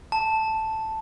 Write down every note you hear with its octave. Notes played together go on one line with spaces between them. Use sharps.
A5